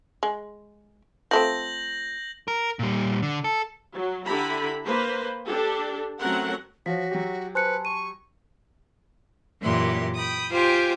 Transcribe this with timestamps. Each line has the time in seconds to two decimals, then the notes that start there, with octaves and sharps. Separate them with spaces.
0.23 G#3
1.31 F3 A3 C4 G6 A#6 F#7
2.48 A#4
2.79 A#2 G3
3.23 D3
3.44 A4
3.93 F#3
4.25 D3 E4 G4 A#5 B5
4.85 A#3 B4 C5
5.47 D4 G4 A4
6.19 F#3 A3 C4 C#4 A#4 F#5
6.86 F3 F#4 C#5 A#6 B6
7.11 F#3 G4
7.55 B4 C5 G#5 A5 C6 F#6 C#7
7.85 C#6 D#7
9.62 F#2 A#2 E3 G4 C6
10.16 G5 B5 D#6
10.51 F4 G4 C5 G5 G#5